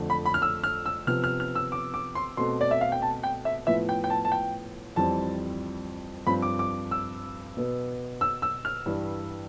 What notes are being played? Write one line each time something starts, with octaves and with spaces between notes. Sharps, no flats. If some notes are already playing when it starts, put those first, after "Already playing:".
Already playing: F2 D3 A3
B5
B5
F6
E6
F6
E6
C3 F3 B3 F6
F6
F6
E6
D6
D6
C6
B2 A3 C4 C6
D5
E5
F5
G5
A5
G5
E5
A2 F3 B3 E5
G5
G5
A5
A5
G5
F2 E3 G3 C4 A5
G2 F3 C4 B5
D6
D6
E6
B2 B3
E6
E6
F6
G2 E3 G3